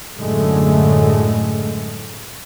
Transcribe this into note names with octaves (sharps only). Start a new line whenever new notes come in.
F#2 A2 D3 G#3 A3